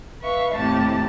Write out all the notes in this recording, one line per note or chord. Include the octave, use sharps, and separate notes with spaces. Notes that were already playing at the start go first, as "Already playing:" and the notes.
B4 E5 F5 C#6
D#2 A2 C3 G4 A5